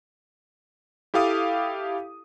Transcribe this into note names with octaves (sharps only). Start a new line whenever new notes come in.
E4 G4 A4 F5 D6 D#6